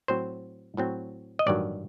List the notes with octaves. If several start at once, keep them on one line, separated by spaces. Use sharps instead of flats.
A2 F#3 C4 C5
A2 F#3 C4
D#5
A1 G2 D#3 F#3 D5